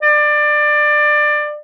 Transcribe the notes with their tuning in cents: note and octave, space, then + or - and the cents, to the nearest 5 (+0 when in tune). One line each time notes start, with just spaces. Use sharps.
D5 +20